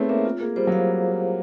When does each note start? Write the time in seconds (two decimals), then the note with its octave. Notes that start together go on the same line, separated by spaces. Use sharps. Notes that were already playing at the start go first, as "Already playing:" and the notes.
Already playing: A3 B3 C4 D#4 G#4 C#5
0.09 A#3 E5
0.25 F4
0.40 A#3 G#4
0.56 G3 C5
0.67 F#3
0.72 F5